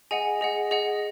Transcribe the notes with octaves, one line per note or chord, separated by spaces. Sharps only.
G#4 D#5 F#5 G#5
G#4 D#5 F#5
G#4 D#5 F#5